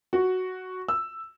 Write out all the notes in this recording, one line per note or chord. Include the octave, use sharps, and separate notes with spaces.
F#4
E6